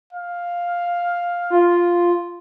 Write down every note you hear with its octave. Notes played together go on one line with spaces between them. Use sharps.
F5
F4